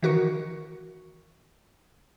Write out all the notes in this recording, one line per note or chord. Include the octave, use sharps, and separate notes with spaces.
D#3 E3 F#4 A#4 C#6 C#7